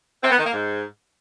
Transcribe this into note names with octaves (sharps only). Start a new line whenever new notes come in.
C4
B3
D#3
A#3
G#2